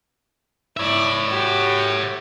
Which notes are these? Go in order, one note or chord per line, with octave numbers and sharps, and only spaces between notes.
E4 C#5 D5 E5
F#4 G4